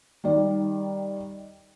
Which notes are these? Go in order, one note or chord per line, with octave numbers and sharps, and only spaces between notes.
D#3 G3 D5